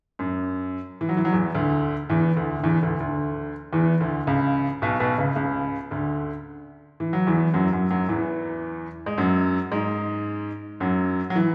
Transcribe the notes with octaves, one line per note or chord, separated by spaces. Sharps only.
F#2
E3
F#3
E3
F#3
E2 E3
D2 D3
E2 E3
D2 D3
D3
E2 E3
D2 D3
D2 D3
E2 E3
D2 D3
C#2 C#3
B1 B2
B1 B2
C#2 C#3
C#2 C#3
D2 D3
E3
F#3
E2 E3
F#2 F#3
F#2 F#3
F#2 F#3
E2 E3
G#3
F#2 F#3
G#2 G#3
F#2 F#3
F#3
E3